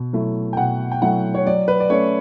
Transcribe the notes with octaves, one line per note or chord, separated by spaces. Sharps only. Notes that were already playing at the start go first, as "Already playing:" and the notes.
Already playing: B2
F#3 A3 E4
G5
B2 F#5
G5
F#3 A3 E4 F#5
C#5
F#3 D5
B4
D5
A3 C#4 C#5